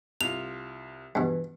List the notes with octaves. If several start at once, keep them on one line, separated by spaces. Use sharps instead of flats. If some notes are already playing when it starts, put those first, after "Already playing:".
C2 F4 F7
G2 B2 E3